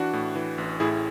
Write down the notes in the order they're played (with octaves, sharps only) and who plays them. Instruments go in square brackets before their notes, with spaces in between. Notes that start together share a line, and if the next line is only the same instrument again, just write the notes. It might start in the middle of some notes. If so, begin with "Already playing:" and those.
Already playing: [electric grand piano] E3 D4 F#4
A2
E3
A1
A2 E4 G#4